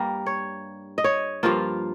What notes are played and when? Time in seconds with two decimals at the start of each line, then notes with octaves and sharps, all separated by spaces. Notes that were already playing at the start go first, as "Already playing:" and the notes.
Already playing: G2 G3 A#3 D#4 A#4
0.26 C#5
0.98 D#5
1.04 C#5
1.43 G2 F3 A#3 F4